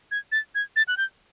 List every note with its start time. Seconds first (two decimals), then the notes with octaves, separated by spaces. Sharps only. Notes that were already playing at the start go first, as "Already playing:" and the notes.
0.11 G#6
0.32 A6
0.55 G#6
0.76 A6
0.88 F#6
0.97 G6